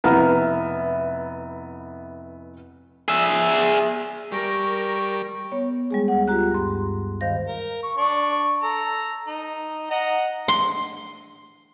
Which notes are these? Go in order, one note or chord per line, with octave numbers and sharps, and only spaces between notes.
F1 B3 E4 E5 A#5 F6
G#4 E5
G3 A#4 C#6
B3 C#5
G3 G#3 G#4
D2 F#5
F4 G4 A#5 F#6
G2 C6
G2 D#3 C5 F5 A#6
A#4
C#6
D4 D5 C#6
A4 A#5
D#4
D#5 F#5 A#5
C6